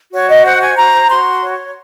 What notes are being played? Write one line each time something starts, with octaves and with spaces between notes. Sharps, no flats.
F#4 C#5
D#5
C5 F#5
G#5
F#4 A#5
F#4 C6
C#5